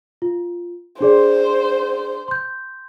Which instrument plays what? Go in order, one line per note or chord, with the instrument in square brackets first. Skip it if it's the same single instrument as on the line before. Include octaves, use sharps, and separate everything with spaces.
[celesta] F4
[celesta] D4 G#4 D5 [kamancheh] C5
[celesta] C6 G6